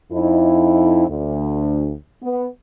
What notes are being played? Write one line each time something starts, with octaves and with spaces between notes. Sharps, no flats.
F2 D#4 E4
D2
B3